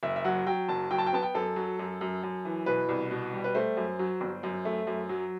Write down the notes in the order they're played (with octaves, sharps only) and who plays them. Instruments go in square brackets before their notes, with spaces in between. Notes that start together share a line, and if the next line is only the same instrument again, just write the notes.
[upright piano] F#1 E5
E5
F#3 F#5
F#3 G5
F#1 A5
F#3 G5
A5
G5
B3 A5
G5
F#2 A4
F#3
F#2
F#2
F#2
E3
B2 B4
C2
B2
G3
B4
A3 C5
F#2
F#3
G1
F#2
A3
F#2
F#3